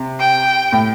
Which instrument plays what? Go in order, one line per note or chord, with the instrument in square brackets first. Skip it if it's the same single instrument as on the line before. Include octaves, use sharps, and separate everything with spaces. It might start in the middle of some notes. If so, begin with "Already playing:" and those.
Already playing: [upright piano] C3
[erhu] G5
[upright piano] A2